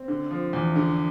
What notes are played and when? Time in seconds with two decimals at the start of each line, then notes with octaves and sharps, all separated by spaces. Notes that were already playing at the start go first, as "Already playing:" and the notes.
Already playing: C4
0.08 D3
0.31 F3
0.53 E2
0.76 D3